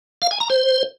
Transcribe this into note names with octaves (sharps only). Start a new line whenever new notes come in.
F5
G#5
A#5
C5